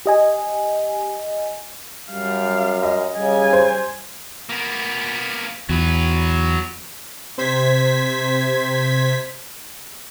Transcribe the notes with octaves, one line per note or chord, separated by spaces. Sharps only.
G4 D#5 G#5
F#2 G3 F5
D#5
C#3 G3 G#5
C5
A#3 B3
E2 F#3 B4
C3 C5 G#6 B6